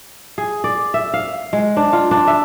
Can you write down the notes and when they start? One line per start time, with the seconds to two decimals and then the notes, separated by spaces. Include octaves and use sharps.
0.38 G#4
0.64 D5
0.94 E5
1.14 F5
1.53 G#3
1.77 D4
1.93 F4
2.11 D4
2.27 E5